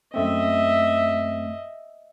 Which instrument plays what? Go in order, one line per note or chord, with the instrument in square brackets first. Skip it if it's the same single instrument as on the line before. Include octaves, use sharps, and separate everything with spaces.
[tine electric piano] F#2 A3 C4 [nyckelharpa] D#5 E5